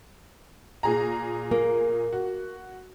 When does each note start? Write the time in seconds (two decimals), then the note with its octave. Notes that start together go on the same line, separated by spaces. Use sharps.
0.83 A#2 G#4 A#5
1.51 A#3
2.12 F#4